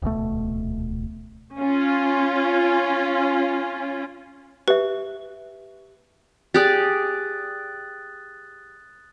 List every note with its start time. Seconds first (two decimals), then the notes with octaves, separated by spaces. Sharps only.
0.02 D#1 C#2 B2 A3
1.59 C#4 F4
4.68 G4 B4 E5
6.54 G4 G#4 D5 D#6 F#6 A6